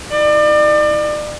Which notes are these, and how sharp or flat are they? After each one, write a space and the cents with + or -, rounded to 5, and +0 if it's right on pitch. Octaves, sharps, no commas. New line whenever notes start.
E4 -30 D5 +35